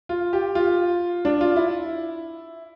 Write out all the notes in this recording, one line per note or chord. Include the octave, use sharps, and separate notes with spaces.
F4
G4
F4
D4
F4
E4